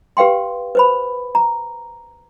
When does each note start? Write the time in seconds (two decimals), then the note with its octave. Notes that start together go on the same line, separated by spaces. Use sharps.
0.17 G4 B4 F5 G5 C6
0.75 B4 C5 B5
1.35 A#5